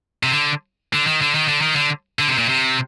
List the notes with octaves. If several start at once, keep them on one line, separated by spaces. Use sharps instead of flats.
C3
D3
D3
D#3
D3
D#3
D3
D#3
D3
D3
C3
A#2
C3